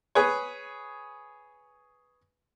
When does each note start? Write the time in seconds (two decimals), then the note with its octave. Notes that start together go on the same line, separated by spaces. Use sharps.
0.15 G#4 B4 C#5